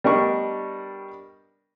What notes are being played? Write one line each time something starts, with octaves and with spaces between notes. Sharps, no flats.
G3 B3 D4 A#4 D#5 C#6